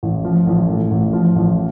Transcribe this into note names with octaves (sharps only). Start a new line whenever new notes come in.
A1
F3
A1
A2
A1
F3
A1